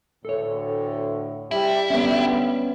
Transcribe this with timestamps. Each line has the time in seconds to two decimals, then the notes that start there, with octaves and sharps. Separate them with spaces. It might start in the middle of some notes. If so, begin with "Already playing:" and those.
0.25 D2 A2 A4 C#5
1.51 G3 E4
1.90 D3 F#3 G3 B3 C#4